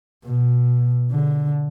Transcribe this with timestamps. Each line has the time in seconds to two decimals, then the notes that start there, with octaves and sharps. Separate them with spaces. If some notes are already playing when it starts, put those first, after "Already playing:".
0.25 B2
1.12 D3